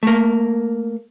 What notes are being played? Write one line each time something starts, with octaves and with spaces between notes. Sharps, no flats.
A3 A#3